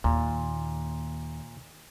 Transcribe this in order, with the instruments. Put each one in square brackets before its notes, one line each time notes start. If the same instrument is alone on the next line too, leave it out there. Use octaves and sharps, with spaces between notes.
[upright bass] D#2 [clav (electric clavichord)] A#2